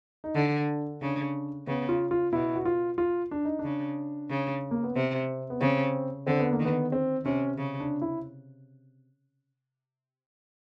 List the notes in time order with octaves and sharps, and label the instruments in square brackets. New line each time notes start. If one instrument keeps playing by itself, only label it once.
[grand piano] D#4
[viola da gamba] D3 [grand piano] D4
[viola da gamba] C#3 [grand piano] D4
[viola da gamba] C#3 [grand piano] B3
[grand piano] F4
F4
[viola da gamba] B2 [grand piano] E4
[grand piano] F#4
F4
F4
D4
D#4
[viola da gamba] C#3 [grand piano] D4
[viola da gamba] C#3
[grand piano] A#3
B3
[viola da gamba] C3 [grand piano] C4
[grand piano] B3
[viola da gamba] C#3 [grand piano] C4
[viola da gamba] D3 [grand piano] C4
[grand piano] B3
A#3
[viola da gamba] D#3
[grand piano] B3
C4
[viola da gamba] C3 [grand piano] C#4
[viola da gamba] C#3
[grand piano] D4
E4